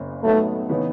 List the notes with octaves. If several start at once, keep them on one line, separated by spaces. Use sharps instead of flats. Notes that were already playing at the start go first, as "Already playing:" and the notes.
Already playing: F#1 C#3
A2 F#3 A3 B3 D#4
C#3 E3 B3 D#4